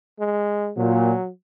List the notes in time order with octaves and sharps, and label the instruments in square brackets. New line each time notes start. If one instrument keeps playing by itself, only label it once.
[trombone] G#3
[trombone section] A#2 [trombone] F#3